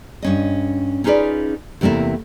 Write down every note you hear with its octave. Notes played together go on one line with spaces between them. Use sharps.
G2 C#4 D#5
C#4 D#4 F4 G#4 B4 D5
E2 C3 A3 A#3 E4